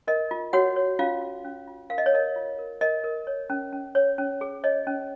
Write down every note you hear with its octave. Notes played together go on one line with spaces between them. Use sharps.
A#4 D#5
F4
F#4 C#5 F#5
C#5
C#4 F4 F5
F4
C#4
F4
A#4 F5
D#5
C#5
A#4 D#5
F4
A#4
A#4 D#5
A#4
C#5
C#4
C#4
C#5
C#4
G#4
C#5 D#5
C#4